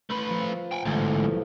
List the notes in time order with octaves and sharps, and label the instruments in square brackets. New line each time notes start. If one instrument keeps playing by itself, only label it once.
[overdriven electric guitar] A3 B4
[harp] F3
[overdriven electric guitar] G5 G#5
[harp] A1 [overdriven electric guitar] D2 G#2
[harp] B1 F3